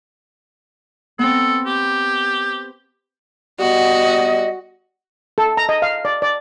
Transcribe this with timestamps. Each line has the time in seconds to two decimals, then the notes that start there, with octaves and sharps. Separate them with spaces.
1.19 B3 C4 A4
1.66 G4
3.60 G3 B3 F#4 D#5
5.38 A4
5.57 A#5
5.69 D#5
5.82 F5
6.05 D5
6.22 D5